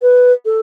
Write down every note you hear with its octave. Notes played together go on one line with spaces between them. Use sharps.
B4
A4